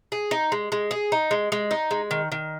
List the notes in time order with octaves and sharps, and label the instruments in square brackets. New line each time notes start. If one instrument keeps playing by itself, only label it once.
[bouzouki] G#4
D#4
G#3
G#3
G#4
D#4
G#3
G#3
D#4
G#3
D#3
D#3